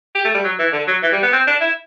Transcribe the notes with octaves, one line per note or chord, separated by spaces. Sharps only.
G4
A3
G3
F#3
E3
D3
F#3
E3
G3
B3
C4
D4
E4